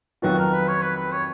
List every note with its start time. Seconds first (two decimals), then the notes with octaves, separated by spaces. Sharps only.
0.22 F2 D#3 F#3 B3 F4 F#4
0.38 A#4
0.53 B4
0.68 C#5
0.82 B4
0.96 B4
1.12 C#5